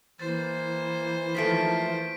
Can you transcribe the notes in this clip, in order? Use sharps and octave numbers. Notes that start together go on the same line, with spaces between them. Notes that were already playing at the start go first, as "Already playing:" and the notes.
E3 A#3 C5 A6
D#3 F3 A3 B6 D7